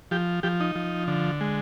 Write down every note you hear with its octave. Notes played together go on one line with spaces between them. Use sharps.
F3 G4
F3 G4
D#4
F3
D3
G#3